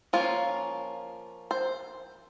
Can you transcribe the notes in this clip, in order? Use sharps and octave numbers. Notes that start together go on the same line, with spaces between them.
F3 A#3 C#4 F4
C5